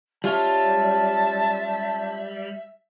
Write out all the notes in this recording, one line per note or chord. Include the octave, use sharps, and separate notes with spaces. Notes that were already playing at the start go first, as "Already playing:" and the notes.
G3 C#4 F4 E5 A5